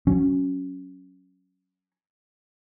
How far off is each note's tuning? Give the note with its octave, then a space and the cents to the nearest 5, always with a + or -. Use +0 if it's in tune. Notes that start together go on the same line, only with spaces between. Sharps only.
F#3 +0 C#4 +0